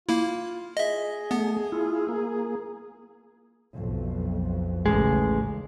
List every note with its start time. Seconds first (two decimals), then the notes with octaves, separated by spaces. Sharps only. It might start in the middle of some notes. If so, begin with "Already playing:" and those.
0.09 A#3 E4 F4
0.77 G#4 D#5 E5
1.31 A3 B3
1.72 E4 F4
2.09 A#3
3.72 B1 F2
4.86 A1 D#2 A2 C#3 G#3